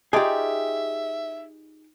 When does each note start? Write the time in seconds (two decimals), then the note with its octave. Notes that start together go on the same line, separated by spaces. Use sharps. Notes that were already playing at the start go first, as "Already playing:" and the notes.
0.13 D#4 F4 G4 G#4 D5 E5